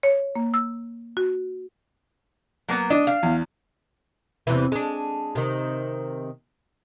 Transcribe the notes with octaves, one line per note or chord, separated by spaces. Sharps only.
C#5
A#3
E6
F#4
F#3 A#3 B3
D4 D#5
F5
E2
E2 C3 E3
G#3 D4
C3 D#3